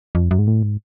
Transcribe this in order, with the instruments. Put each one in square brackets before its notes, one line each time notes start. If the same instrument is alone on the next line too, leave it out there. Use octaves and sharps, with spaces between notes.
[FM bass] F2
F#2
G#2
A2
G#2